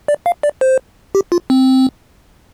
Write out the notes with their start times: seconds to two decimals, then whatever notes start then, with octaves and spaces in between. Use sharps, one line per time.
0.08 D5
0.26 F5
0.43 D5
0.61 C5
1.15 G4
1.32 F4
1.50 C4